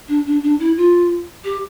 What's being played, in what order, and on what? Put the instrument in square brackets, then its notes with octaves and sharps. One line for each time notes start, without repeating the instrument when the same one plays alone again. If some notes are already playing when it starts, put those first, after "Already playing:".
[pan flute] D4
D4
D4
E4
F4
G4